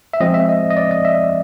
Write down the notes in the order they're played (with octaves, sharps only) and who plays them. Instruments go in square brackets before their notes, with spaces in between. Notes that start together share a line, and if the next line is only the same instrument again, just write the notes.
[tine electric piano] E5
F3 G#3 C4 D#5
E5
D#5
D#5
D5
D#5
E5